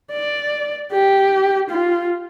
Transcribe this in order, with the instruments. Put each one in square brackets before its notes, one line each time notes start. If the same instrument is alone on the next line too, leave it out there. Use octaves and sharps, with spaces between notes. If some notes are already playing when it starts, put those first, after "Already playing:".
[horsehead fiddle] D5
G4
F4